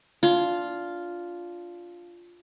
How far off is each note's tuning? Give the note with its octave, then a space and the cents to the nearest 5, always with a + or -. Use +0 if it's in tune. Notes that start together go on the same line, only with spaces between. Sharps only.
D4 -15 F4 +0